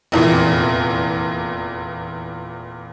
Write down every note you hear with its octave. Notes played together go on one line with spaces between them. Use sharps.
F1 E2 A#2 E3